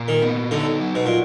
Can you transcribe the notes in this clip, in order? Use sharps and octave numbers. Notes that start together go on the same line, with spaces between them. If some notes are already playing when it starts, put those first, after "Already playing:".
Already playing: A#2 F4
D#3
B3
D3 D#4
F#3
B2
A#2